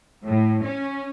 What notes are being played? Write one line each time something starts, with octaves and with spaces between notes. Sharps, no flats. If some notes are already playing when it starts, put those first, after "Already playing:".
A2
C#4